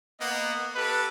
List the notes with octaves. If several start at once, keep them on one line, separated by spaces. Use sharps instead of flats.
A#3 B3 D#5 F#5
G4 A4 B4